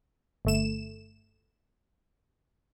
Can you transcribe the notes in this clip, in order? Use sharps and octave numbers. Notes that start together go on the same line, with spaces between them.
G1 A3 E7